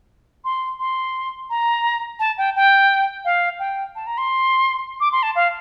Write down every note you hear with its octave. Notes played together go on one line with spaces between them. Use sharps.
C6
C6
A#5
A5
G5
G5
F5
G5
A5
A#5
C6
D6
C6
A5
F5